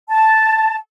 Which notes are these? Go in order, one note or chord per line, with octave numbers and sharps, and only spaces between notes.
A5